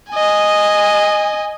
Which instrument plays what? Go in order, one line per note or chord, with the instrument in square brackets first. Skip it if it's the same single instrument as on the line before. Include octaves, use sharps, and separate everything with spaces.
[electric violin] D#5 G#5